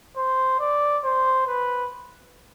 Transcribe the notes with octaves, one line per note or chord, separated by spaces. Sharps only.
C5
D5
C5
B4